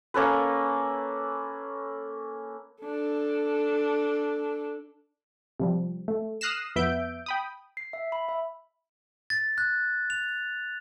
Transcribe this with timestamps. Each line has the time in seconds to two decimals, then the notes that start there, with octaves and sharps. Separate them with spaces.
0.14 A#3 C#4 A4 B4
2.83 D4 A4
5.60 C3 F3 G3
6.08 A3
6.41 D#6 F6 F#6 A#6 C7 E7
6.76 F2 B3 E5 G6 D7
7.26 G5 B5 D#6
7.77 C7
7.93 E5
8.12 B5
8.29 E5
9.30 A6
9.58 F#6
10.10 F7